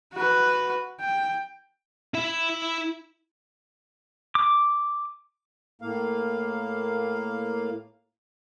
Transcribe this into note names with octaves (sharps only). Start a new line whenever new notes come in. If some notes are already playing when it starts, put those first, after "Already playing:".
F#4 B4
G5
E4 E5
D6
A2 A#3 F5